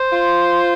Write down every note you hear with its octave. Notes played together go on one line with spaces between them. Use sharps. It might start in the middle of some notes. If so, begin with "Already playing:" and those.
Already playing: C5
F4